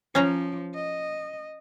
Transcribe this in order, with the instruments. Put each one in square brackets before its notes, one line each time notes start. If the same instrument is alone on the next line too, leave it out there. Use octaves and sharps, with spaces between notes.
[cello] F3 [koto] C#4 C5 A#5
[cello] D#5